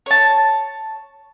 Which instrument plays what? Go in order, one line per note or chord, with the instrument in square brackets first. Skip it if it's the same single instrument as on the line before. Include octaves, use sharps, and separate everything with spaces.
[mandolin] C#5 A5